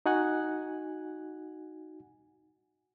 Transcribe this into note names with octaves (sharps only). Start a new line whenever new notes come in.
D#4 F#4 F#5 G#5 F#6